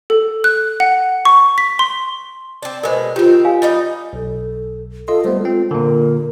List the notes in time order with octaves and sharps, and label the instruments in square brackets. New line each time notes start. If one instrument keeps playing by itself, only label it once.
[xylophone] A4
F#6
F#5
C#6
B6
C6
[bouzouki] C4 D4
[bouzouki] B2 G#3 [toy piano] A#4 C5
[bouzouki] D#3 C4 [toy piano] F4 G4
[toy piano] G4 F5 G#5
[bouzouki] G3 D#4 D#5
[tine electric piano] B1 [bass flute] A4
[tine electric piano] F4 D#5 C6 [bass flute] A4
[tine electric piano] G3 A3 B3 [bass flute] C5
[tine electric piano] G#3 C4 [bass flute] F4
[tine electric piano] A#2 D3 [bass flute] A#4